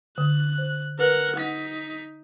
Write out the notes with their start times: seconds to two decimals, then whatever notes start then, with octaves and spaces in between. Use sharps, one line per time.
0.18 D3 F#6
0.58 C5
0.99 A#4 B4 F#5
1.36 D#4 F#5 B6